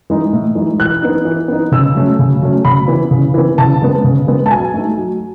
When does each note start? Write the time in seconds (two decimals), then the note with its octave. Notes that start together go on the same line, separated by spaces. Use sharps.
0.10 E3 G#3 D#4
0.33 A2
0.55 E3 G#3 D#4
0.79 E3 F#6
1.02 B3 D#4
1.25 E3
1.48 B3 D#4
1.72 C#3 E6
1.95 F#3 A3 C#4
2.19 C#3
2.42 F#3 A3 C#4
2.65 C#3 B5
2.88 E3 B3
3.11 C#3
3.34 E3 B3
3.58 C#3 A5
3.82 G#3 B3
4.04 C#3
4.27 G#3 B3
4.46 A5
4.51 F#3 G#5
4.74 A3 D#4
4.97 F#3